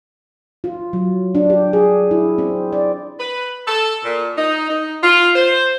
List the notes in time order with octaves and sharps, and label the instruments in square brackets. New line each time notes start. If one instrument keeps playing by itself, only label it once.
[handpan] F4
F#3
D4
G4
G#4
E4
C4
D5
[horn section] B4
A4
A#2
D#4
D#4
F4
C5